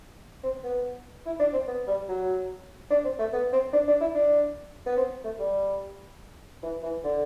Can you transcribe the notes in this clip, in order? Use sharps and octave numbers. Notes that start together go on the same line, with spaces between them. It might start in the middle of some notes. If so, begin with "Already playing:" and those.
C4
B3
E4
D4
C4
B3
G3
F#3
D4
C4
A3
B3
C4
D4
D4
E4
D4
B3
C4
A3
G3
E3
E3
D3